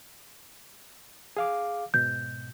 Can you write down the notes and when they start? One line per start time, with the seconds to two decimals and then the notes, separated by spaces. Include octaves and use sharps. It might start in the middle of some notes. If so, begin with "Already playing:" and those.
1.37 G#4 F5 D6
1.94 G#2 B2 G6